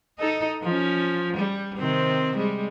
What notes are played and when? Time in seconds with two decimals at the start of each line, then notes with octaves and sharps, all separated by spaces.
0.19 D#4 A4 D#5
0.63 F3 C#4
1.37 G3
1.77 C3 D#3 C4
2.36 G3 G#3